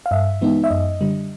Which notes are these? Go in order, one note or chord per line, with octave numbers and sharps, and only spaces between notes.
F5
G2 E5
E3 G#3 B3 D#4
E5
F#2 D#5
D3 G3